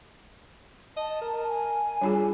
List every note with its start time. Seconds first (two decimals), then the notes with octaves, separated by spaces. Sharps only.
0.97 D#5 A5
1.21 A#4
1.49 G#5
2.02 G3 D4 F4 G#4